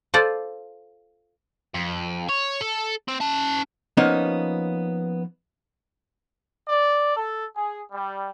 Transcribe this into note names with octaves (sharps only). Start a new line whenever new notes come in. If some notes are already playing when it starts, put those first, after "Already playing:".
F4 A4 C5 D5
F2
C#5
A4
C4
C#4 A5
F3 A#3 B3 C#4 D#4
D5
A4
G#4
G3